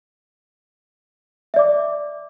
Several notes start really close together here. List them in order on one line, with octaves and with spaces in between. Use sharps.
E5 D5 D6